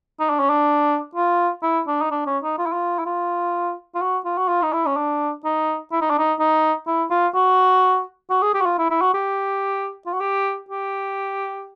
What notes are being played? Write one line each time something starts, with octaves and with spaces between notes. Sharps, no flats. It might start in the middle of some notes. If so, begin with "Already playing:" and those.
D#4
D4
C#4
D4
F4
E4
D4
D#4
D4
C#4
D#4
F4
E4
F4
E4
F4
F4
F#4
F4
F#4
F4
D#4
E4
C#4
D4
D#4
E4
D#4
D4
D#4
D#4
E4
F4
F#4
F#4
G#4
G4
F#4
F4
E4
E4
F#4
G4
F4
F#4
G4
G4